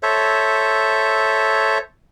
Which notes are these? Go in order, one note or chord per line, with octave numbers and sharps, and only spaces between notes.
A4 C5 C#5 E5